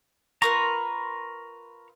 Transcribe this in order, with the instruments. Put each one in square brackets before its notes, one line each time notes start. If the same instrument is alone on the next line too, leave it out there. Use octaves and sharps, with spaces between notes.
[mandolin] F4 A#4 B4 [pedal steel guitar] A#5 C#6